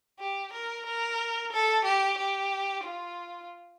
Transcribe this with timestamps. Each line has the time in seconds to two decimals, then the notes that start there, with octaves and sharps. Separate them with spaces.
0.20 G4
0.53 A#4
0.86 A#4
1.52 A4
1.85 G4
2.18 G4
2.84 F4